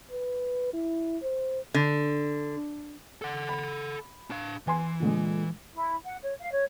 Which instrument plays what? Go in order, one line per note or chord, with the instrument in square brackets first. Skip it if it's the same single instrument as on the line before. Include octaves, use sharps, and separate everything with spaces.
[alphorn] B4
E4
C5
[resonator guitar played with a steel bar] D3
[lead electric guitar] A4 F#5
[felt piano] B5
[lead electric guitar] D4 F5
[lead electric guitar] E3 [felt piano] B4 G#5 C6
[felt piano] A#2 D3 G#3
[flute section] E4
F#5
C#5
F5
C#5